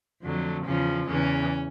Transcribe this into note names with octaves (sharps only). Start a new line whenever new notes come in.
F2 D3 F#3 A3
E2 C#3 F3 C#4
E2 C#3 E3 C#4